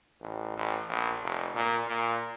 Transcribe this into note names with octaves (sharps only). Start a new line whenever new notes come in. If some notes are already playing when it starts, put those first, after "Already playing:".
A1
A1
A#1
F1
A#2
A#2